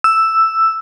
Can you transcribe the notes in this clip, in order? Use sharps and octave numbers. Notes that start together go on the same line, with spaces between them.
E6